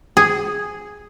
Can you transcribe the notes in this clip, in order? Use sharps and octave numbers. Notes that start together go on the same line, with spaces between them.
G#4